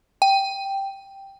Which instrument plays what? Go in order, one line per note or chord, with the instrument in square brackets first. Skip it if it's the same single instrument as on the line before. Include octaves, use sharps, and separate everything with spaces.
[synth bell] G5